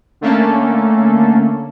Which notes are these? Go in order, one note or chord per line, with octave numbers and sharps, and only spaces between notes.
D3 A3 A#3 C#4 A4